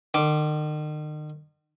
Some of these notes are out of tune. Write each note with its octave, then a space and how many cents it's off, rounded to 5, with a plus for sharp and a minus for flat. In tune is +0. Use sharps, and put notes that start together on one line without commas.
D#3 -40 D6 +0